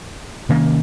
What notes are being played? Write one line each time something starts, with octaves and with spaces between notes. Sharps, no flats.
C3 D#3 A#3 C#4